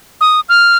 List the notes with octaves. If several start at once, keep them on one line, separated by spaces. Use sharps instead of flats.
D#6
F6